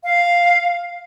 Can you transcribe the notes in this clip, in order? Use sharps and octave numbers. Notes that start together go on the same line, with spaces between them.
F5